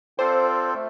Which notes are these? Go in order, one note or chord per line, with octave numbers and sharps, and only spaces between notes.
C4 F4 A4 C5 D5 G5
A3